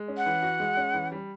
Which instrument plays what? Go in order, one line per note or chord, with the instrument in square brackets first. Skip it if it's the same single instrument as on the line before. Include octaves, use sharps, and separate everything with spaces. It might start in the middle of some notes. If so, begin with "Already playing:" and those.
Already playing: [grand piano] G#3
C#4
[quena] F#5
[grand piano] E3
F#4
G#3
C#4
E3
G3